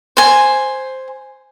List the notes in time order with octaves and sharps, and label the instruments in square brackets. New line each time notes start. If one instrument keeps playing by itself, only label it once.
[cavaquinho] C5 G#5